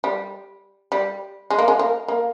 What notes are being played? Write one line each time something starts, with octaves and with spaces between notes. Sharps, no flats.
G3
G3
G#3
A#3
G#3
A#3
A#3